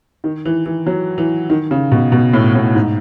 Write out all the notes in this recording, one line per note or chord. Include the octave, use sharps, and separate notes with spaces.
D#3
E3
E3
F#3
E3
D#3
C#3
B2
B2
A2
A2
G#2